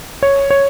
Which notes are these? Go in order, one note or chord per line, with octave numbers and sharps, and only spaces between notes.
C#5
C#5